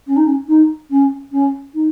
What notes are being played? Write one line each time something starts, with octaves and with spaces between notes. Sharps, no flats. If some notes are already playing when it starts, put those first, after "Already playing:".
C#4
D#4
C#4
D#4
C#4
C#4
D#4